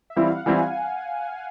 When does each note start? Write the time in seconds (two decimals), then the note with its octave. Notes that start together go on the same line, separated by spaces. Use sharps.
0.10 E5
0.16 E3 G3 C4 E4 F5
0.31 F#5
0.46 E3 G3 C4 E4 G#5